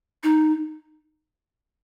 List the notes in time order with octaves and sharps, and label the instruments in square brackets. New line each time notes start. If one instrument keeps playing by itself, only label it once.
[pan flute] D#4